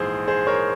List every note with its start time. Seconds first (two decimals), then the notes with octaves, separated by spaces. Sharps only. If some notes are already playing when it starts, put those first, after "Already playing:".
Already playing: A#1 G#2 E3 G#4 C5
0.28 G#4 C5
0.47 A#4 C#5